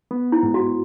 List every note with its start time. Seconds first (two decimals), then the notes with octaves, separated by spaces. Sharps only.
0.11 B3
0.32 E4
0.43 G#2
0.54 F#4